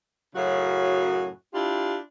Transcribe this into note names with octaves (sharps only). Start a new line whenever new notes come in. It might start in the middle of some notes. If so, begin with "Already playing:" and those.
F#2 A2 C#3 F#3 F#4
D4 E4 F4 G4